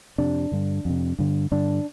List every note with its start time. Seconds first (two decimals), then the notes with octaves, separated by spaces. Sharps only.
0.18 F2 C3 D4
0.52 G2 D3
0.85 F2 C3
1.19 G2 D3
1.52 G2 D3 D4